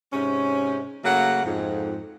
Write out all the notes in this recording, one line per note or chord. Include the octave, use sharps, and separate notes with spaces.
G#2 C3 C#4
C#3 F#3 A3 A#3 F#5
F2 G#2